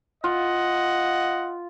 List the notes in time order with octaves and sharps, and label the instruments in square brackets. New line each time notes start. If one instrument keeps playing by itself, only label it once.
[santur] F4 [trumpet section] D#5 F#5